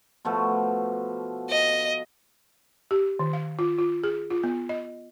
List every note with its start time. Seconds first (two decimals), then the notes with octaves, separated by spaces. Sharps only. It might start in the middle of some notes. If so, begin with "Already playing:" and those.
0.25 B2 F3 A3
1.49 D#5
2.91 G4
3.19 D#3
3.33 F5
3.59 F4
3.79 F4
4.04 G#4
4.30 F4
4.43 B3
4.69 D#5